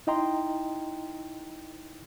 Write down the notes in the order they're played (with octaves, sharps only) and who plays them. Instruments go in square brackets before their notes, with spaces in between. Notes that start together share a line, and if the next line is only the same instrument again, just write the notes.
[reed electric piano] D#4 E4 D#5 G5 A#5 C6